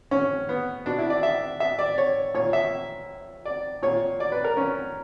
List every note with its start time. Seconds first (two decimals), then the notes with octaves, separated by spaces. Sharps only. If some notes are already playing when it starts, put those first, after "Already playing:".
0.11 C#4
0.49 B3
0.86 B2 D4
0.98 E4
1.10 D5
1.23 E5
1.60 E5
1.79 D5
1.98 C#5
2.34 A#2 C#5
2.53 E5
3.45 D5
3.82 A#2 C#5
4.20 D5
4.32 B4
4.44 A#4
4.57 C#4